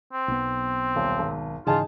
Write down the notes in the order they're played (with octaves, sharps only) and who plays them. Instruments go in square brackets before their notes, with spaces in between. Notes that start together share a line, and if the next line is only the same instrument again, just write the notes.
[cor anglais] C4
[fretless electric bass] B1 B3
[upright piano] D#1
G#1
[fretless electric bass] G#2 C#3 E3 [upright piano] D#4 G#4 A5 [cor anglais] F4